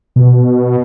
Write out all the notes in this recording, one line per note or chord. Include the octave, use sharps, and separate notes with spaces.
B2